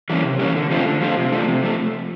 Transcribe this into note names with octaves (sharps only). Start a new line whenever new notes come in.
E3 G3 A#3 C#4
C3
E3 G3 A#3 C#4
D3
F3 A3 C4 F4
D3
F3 A3 C4 F4
C3
F3 A3 D4
C3
F3 A3